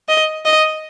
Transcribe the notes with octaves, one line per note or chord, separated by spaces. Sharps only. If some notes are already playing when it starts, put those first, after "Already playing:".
D#5
D#5